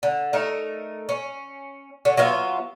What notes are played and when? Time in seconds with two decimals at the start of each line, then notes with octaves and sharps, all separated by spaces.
0.03 D3
0.33 A3 D#4 A#4
1.09 C#4
2.05 D3 C#4
2.17 F#3 B3 F4 E5